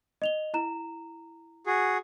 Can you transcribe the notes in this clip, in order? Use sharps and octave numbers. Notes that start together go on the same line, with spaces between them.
D#5 F7 G7
E4 A#5 E7
F#4 G#4